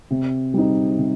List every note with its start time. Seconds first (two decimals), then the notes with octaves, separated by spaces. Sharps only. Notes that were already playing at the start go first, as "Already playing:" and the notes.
0.11 C3
0.54 G3 C4 D#4
0.98 C3